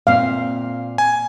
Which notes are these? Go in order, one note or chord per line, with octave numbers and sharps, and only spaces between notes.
A#2 C4 F5
G#5